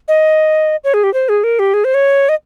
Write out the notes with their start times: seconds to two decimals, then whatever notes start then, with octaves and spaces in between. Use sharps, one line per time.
0.08 D#5
0.84 C#5
0.94 G#4
1.04 G4
1.14 C5
1.29 G#4
1.44 A#4
1.59 G4
1.74 G#4
1.84 C5
1.94 C#5
2.29 D#5